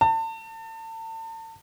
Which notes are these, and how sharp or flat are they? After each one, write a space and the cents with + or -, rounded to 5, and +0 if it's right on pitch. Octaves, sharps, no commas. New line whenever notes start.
A5 +35